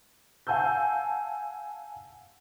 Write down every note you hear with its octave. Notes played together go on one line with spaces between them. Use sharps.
F5 F#5 G#5 A5 E6 G6